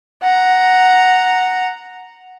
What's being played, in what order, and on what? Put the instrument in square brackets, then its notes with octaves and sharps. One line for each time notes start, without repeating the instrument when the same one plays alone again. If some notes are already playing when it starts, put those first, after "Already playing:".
[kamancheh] F#5 A#5